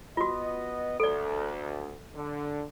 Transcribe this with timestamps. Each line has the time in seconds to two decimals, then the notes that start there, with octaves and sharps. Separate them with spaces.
0.17 B3 F4 F#4 D#5
1.00 D2 A4 D5
2.15 D3